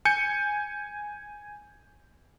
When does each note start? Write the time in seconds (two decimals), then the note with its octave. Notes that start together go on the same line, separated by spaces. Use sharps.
0.05 G#5 G6 C#7